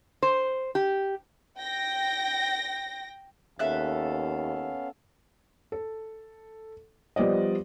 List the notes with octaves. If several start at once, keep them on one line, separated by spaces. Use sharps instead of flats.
C5
G4
G5 A#6
D#2 B3 C#4 A4 E5 F5 F#6
A4
F3 G3 B3 D5 D#5